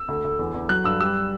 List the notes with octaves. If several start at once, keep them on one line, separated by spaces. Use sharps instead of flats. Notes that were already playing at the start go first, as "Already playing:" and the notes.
Already playing: E6
D2
D2
E2
E2
F#3 F#6
G2 E6
G3 E6